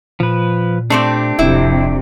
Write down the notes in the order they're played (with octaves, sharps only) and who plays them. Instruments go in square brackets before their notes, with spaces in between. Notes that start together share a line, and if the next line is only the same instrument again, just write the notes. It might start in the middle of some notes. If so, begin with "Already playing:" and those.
[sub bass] A#2 [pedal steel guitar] F3 B4
[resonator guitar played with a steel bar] A3 C4 D5 [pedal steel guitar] D4 G4
[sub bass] D1 [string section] F2 C3 [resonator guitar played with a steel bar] E4